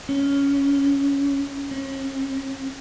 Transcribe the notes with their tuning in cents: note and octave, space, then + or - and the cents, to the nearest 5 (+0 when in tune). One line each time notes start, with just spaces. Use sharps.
C#4 +10
C#4 -40